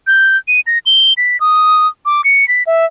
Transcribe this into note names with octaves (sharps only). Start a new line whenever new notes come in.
G6
D#7
A#6
G7
B6
D#6
D6
C#7
B6
E5